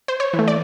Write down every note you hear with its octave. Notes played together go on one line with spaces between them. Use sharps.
C5
C#5
E3
A3
D5